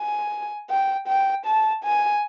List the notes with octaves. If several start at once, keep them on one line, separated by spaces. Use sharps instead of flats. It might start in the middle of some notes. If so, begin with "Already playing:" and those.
Already playing: G#5
G5
G5
A5
G#5